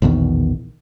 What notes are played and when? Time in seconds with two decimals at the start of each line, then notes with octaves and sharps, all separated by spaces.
0.02 A#1 E2 B2 D#3